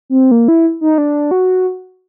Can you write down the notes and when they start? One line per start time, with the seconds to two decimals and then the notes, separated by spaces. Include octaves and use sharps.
0.10 C4
0.31 A#3
0.48 E4
0.81 D#4
0.98 D4
1.31 F#4